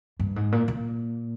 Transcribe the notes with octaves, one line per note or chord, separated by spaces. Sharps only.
G2
G#2
A#2
A#2